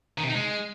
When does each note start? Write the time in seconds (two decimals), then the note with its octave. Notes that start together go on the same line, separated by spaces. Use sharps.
0.18 D#3
0.23 C3
0.29 D#4
0.35 G#3